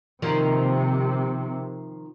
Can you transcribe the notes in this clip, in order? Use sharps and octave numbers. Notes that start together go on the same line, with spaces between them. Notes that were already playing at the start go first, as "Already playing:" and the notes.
C3 D#3 F3 A#3